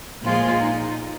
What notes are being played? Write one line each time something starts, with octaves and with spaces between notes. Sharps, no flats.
A#2 F3 G#3 F4
D#4